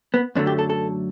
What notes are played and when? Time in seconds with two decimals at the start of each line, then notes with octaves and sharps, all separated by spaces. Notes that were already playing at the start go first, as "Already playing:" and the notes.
0.14 B3
0.35 F#2 D3 F#3 A3 D4
0.47 G4
0.59 A4
0.70 A4